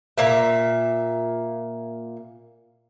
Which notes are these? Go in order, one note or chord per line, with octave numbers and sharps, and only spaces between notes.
A#2 A#3 E5